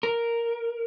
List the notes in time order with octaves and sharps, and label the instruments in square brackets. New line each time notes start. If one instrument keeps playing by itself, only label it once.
[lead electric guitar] A#4